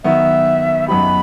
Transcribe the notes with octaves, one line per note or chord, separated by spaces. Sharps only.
D#3 F#3 B3 E5
F#2 F#3 B3 D#4 G4 B5